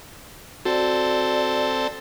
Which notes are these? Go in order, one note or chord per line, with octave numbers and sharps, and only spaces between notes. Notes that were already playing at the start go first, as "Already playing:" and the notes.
C4 F#4 A4 D5